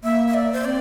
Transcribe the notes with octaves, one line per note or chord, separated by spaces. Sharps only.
A#3 E5
E5
D5
C5
C4 D5